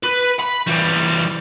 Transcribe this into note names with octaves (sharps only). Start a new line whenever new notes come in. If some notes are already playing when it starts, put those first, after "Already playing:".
B4
B5
E3 G3